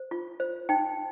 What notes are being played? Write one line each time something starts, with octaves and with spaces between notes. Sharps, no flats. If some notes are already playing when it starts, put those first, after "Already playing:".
Already playing: C5
F4
C5
D#4 G5